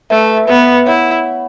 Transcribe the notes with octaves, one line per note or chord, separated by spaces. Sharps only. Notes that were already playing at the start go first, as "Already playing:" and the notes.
A3 B4 E5
B3 B4 E5
E4 C#5 F#5